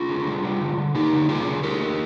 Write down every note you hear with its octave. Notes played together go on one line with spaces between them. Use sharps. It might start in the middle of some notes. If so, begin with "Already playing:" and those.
Already playing: F4 G#4
D3
G3
G3
D3
D3
A#3 D#4 G4
D3
G3 F4 G#4
D3
D3 G4 A#4
A#3